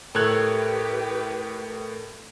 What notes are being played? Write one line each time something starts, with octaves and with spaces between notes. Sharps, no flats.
A2 A3 G4 A#4 B4 C#5 F#6 G#6